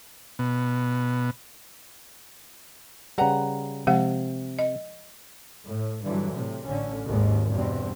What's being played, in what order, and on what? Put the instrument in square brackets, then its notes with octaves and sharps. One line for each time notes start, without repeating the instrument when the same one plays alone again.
[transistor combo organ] B2
[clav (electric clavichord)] C#3 G3 [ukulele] B4 F#5 A#5
[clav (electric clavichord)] C3 [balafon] F3 G#3 F5
[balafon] D#5
[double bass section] A2
G2 D3 E3 F#3
A2 C3
A1 D3 C#4
G#1 D#2 G#2
E2 G2 B2 C4